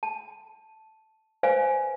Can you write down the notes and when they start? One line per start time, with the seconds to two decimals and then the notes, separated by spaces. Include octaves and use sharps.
0.03 A5
1.43 B4 C5 D5 F5 G#5